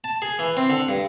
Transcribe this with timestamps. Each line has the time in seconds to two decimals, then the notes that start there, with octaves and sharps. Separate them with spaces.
0.04 A5
0.22 G#4
0.39 E3
0.57 C4
0.70 D3
0.88 G2